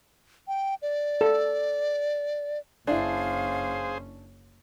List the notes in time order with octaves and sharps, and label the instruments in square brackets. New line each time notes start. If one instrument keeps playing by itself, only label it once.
[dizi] G5
D5
[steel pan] A4
[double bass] F#1 C#4 [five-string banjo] D4 E4 [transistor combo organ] G#4 C5 [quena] F5